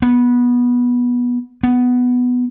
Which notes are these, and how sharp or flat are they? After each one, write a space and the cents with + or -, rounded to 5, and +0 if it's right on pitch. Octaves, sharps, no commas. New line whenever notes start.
B3 -15
B3 +5